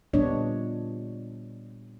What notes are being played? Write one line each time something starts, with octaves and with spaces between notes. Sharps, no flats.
A#2 G3 B3 D4 C#5 D#5